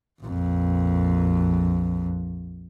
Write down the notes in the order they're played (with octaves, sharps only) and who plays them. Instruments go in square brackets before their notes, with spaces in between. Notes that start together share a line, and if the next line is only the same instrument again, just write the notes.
[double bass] A#1 F2